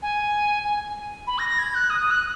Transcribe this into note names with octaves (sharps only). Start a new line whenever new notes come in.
G#5
G#5
B5
A#6
A#6
G#6
F#6
D#6
D#6
F#6